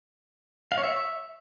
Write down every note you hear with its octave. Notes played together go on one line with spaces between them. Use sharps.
F5
C#5
E5